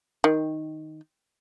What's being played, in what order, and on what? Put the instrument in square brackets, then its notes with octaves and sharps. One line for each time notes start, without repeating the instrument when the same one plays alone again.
[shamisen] D#3